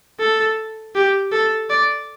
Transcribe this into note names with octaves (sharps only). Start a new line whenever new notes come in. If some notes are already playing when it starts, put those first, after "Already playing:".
A4
G4
A4
D5